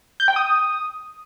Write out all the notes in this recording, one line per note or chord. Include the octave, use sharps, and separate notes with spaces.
G6
G5
D#6